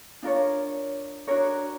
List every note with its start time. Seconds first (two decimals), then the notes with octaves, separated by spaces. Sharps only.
0.23 D4 F4 A#4 C#5
1.27 D4 F#4 A#4 C#5